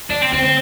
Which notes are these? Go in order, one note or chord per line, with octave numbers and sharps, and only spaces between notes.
D3 D4
C4
D3 C4
C4